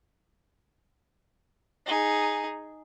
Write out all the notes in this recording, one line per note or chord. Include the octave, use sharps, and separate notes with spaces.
D#4 G#4